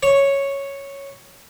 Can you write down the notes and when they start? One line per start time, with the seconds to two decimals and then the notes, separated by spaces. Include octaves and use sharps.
0.03 C#5